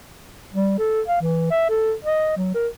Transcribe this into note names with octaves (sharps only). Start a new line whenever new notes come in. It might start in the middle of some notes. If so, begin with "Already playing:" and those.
G3
A4
F5
E3
E5
A4
D#5
F#3
A#4